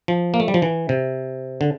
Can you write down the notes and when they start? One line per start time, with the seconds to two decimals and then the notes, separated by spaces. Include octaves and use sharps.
0.08 F3
0.34 A#3
0.40 A3
0.48 G3
0.54 F3
0.62 E3
0.89 C3
1.61 D3